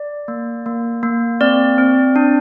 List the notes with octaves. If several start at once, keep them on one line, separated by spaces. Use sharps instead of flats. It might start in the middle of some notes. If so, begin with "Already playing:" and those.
Already playing: D5
A#3
A#3
A#3
C4 D5
C4
D4